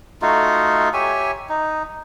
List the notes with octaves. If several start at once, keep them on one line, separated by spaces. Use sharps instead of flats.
A3 D#4 F4 F#4
G4 C#5 E5 G#5
D#4